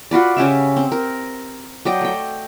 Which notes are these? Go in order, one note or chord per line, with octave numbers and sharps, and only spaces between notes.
F4 F#4 B4 D5
C#3 C#4 G4 E5
C4
A#4
F#3 D5 D#5 G5
A3 G5